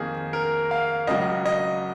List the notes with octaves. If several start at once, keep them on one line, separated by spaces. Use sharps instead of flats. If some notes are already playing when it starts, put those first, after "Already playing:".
Already playing: F2 D#3 A#3 G#4
A#4
F5
C#2 C#3 F#3 D#5
D#5